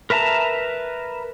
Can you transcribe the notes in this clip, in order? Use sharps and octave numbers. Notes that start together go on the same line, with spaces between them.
A#4 B4 E5 A5 A#5